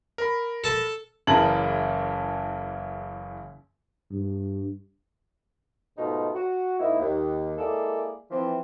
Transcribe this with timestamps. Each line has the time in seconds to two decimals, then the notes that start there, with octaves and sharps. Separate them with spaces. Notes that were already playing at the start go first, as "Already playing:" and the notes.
0.18 A#4 B5
0.64 A4 A5
1.27 F#1 C#3 E3 A5 A#5 F#7
4.11 G2
5.97 G#2 B2 G#3 A3 D#4 F4
6.35 F#4
6.79 G#2 A#3 D#4 E4
6.99 D#2
7.58 G#3 A#3 E4 G#4 A4 D5
8.31 E3 F3 C4